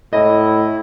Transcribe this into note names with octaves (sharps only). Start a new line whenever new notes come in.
A2 E4 D#5